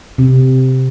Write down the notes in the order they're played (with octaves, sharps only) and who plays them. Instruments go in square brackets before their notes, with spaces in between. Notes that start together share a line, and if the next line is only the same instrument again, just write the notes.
[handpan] C3